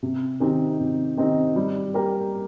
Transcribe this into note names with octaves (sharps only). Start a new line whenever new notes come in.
C3
D#3 C4 D#4 G4
C3
D#3 C4 D#4 G4
G3
A#3 G4 A#4